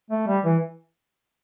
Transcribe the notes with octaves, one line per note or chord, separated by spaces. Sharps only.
A3
G3
E3